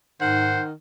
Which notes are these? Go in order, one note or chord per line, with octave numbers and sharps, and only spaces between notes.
G#2 D#3 C5 F#5